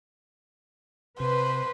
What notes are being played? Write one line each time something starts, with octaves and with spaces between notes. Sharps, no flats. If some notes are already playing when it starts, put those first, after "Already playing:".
C3 B4 C5